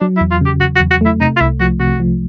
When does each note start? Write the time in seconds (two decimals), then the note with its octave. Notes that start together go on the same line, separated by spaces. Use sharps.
0.01 F#3 D4
0.17 E4
0.21 E2
0.31 F4
0.41 C#3 G4
0.61 E2 F#4
0.76 F#4
0.80 E2
0.91 F#4
1.01 A3 E4
1.20 C3 D#4
1.37 F4
1.41 C2 E4
1.60 F3 F#4
1.80 C3 F#4
2.00 F3